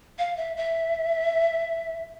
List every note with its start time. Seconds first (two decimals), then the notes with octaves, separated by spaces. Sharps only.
0.19 F5
0.37 E5
0.57 E5